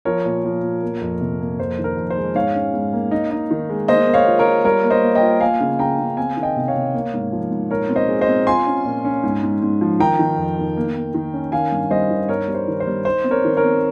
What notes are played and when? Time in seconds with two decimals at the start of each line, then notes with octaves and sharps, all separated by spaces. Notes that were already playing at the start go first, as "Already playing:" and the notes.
0.05 F3 A#4 C#5
0.25 A#2
0.45 F3
0.63 A#2
0.83 A#3
1.01 F2
1.21 C3
1.40 A#3
1.59 F2 C5
1.78 D#3
1.84 A#4
1.97 F2
2.10 C5
2.17 G#3
2.35 G#2 C#5 F5
2.55 C#4
2.73 G#2
2.93 A#3
3.11 D#4
3.31 D#4
3.50 D#3
3.70 G#3
3.88 A#3 C5 D#5
4.07 A#3
4.14 C#5 F5
4.27 F4
4.39 A#4 C#5
4.46 F4
4.65 G3 A#4 C#5
4.84 A#3
4.90 C5 D#5
5.03 A#3
5.15 D#5 G5
5.21 F4
5.41 A#3 F5 G#5
5.60 C#3
5.79 C#3 G5 A#5
5.99 C#3
6.17 C4 F5 G#5
6.37 D#3
6.42 D#5 G5
6.56 C3
6.68 C#5 F5
6.75 C3
6.94 A#3
7.14 G#2
7.32 F3
7.51 G#2
7.70 A#2 A#4 C#5
7.89 C4
7.96 C5 D#5
8.08 G#3
8.21 C5 D#5
8.28 C4
8.47 F4 G#5 C6
8.67 C#4
8.85 A#2
9.05 C#4
9.23 G#2
9.43 G#2
9.62 G#2
9.81 F3
9.99 D#3 G5 A#5
10.19 D#3
10.37 F2
10.58 D#3
10.77 A#3
10.95 A#3
11.14 D#3
11.34 C#4
11.52 D#3 F5 G#5
11.72 G2
11.91 G3 C5 D#5
12.10 D#3
12.29 G2 A#4 C#5
12.48 G3
12.54 C5
12.67 D#3
12.80 C5
12.87 G3
13.05 D#4 C5
13.24 C4
13.31 A#4 C#5
13.44 D#3
13.57 A#4 C#5
13.63 C4